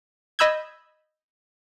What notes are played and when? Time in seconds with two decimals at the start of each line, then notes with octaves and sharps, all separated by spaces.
0.39 D#5 B5 E6 G6 G#6